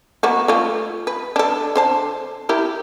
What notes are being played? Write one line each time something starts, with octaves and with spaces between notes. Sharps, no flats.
A#3 B3 F#4
A3 F4
B4
D4 A4
D3 C5 A5
E4 G4 A#4